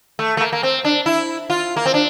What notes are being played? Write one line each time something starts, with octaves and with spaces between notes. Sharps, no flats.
A3
A3
A#3
A#3
C4
D4
E4
F4
A#3
C4
D4